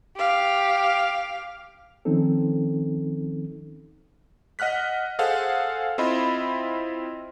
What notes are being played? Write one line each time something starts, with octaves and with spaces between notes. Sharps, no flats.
G4 F5
D#3 F3 C4 C#4 D#4 A4
D#5 F#5 F6 F#6 B6
G#4 A4 C5 F5 F#5
C4 E4 F4 D#5 E5 B5